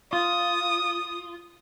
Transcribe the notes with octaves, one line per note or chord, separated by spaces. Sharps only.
F4 D#6